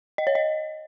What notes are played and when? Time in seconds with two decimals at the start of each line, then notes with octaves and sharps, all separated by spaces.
0.18 D#5
0.27 C#5
0.35 D#5